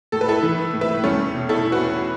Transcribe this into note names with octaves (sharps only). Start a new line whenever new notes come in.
A2 A4
B4
A2 E4 A4
E3
E3
A2
B4 E5
A2
E2 A3 C#4
E2
B2
B2 E4 A4
E2
F#4 B4
E2